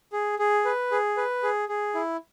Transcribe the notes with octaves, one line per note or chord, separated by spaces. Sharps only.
G#4
G#4
B4
G#4
B4
G#4
G#4
E4